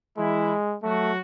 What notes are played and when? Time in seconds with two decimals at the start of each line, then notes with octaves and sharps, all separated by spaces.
0.17 E3 G#3 E4
0.83 F#3 A3 F#4